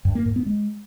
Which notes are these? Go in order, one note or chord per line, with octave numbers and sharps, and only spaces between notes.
G2
A#3
G#2
B3
G#3